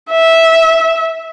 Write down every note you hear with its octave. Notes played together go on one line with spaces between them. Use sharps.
E5